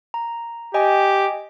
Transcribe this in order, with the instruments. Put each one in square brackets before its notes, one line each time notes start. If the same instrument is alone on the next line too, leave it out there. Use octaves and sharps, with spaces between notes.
[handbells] A#5
[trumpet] G4 [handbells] D#5 G5 G#5